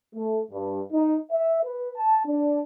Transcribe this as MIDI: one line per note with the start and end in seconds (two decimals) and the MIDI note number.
0.15 0.41 57
0.51 0.81 43
0.93 1.17 63
1.31 1.60 76
1.63 1.90 71
1.97 2.20 81
2.26 2.60 62